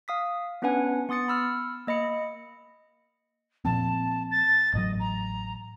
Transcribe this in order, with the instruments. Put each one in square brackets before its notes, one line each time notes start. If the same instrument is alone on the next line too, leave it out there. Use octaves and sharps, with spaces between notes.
[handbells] F5 D#6 B6
B3 C#4 D4 B4 F#5 G#5
B3 C6 D#6 A6 C#7
B5 E6 F6
A#3 D#5 B5 C#7
[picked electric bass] A#2 F3 C4 [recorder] A5
[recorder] A6
[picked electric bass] A1 A2 F#3 [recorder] D#5
[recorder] A#5